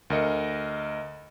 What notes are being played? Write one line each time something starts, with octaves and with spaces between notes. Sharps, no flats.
D2 A#4 D#5 C#7